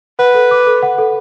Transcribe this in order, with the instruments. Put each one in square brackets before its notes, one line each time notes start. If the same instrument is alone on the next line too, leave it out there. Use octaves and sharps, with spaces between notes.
[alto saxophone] B4 [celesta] F#5
[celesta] A4
D6
A4
F#5
A4